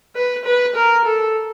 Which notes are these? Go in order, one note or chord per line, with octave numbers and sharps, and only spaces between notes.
B4
B4
A#4
A4